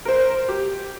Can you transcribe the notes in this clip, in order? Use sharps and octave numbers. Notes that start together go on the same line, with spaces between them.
A#4 C5
G4